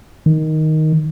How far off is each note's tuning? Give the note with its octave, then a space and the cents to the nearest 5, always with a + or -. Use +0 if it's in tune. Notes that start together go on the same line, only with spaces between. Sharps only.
D#3 +5